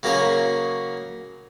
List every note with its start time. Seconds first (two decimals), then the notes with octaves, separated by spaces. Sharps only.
0.03 C#3 F#3 A#3 C#4 G#4